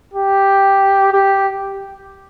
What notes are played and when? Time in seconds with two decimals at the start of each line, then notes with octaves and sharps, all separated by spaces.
0.13 G4
1.12 G4